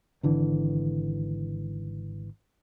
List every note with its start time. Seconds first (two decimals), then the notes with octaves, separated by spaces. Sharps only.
0.23 G#1 D3 E3